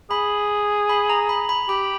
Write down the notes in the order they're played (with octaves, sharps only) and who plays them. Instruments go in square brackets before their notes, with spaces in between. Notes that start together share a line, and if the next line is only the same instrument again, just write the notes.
[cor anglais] G#4 [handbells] B5
[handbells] B5
A#5
B5
B5
[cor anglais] G4 [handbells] B5